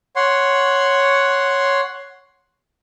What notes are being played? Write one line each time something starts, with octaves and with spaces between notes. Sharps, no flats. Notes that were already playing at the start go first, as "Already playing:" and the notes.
C#5 F#5 C6